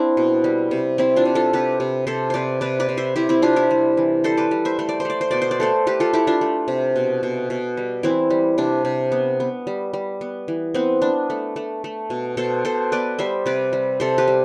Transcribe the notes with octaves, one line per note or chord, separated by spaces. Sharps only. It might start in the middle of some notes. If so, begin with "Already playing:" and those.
Already playing: C4 D4 E4
B2
G3
C3
C3 C4 E4
D4 F4
C3
F4 A4
C3 G4 B4
C3
C3 A4 C5
C3 B4 C5 D5
C3 B4 D5
B4 D5
C3
C5 E5
C3 E4 G4
C4 E4
C3 D4 F4
E4 G4
G3
E3
G3 A4 C5
B4 D5
G3
C5 E5
A3 C5
D5
C5
A3 D5
C5
B2 D5
C5
D5
A3 A4 C5
A3 G4 B4
F4 A4
A3 E4 G4
D4 F4
A3
C3
B2
B2
B2
G3
E3 C4 E4
G3
C3 D4
C3
B3
B3
G3
G3
B3
E3
B3 C4
B3 D4
A3
A3
A3
B2
B2 A4 C5
B2 A4 C5
B3 B4 D5
G3 C5 E5
C3 B4 D5
G3
C3 A4 C5
G4 B4
G3